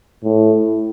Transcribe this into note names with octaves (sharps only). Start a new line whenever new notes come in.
A2